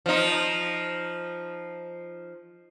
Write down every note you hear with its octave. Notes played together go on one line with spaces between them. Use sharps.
F3 D#4